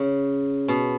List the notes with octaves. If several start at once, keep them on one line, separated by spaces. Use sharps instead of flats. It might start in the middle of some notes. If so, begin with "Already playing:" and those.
Already playing: C#3
B2